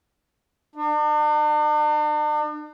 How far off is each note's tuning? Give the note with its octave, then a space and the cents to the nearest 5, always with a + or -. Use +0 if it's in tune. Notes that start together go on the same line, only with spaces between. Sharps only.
D4 +45